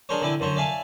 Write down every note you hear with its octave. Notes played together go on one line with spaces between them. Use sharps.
D4 G#4 A#4 C5 C#5
D3 C4 E4 G#5 D6
F#2 D3 C5 C#5
D5 E5 F5 G#5 A5